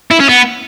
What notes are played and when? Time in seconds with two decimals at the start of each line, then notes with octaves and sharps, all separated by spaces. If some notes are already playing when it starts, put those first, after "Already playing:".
0.11 E4
0.20 C#4
0.29 B3